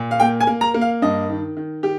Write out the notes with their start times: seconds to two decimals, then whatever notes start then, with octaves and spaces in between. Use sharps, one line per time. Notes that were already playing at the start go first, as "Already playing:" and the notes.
Already playing: A#2
0.11 F5
0.20 A#3 G5
0.41 G#5
0.47 A#3
0.61 A#5
0.74 A#3
0.81 F5
1.02 G2 D#5
1.30 D#3
1.57 D#3
1.83 D#3 G4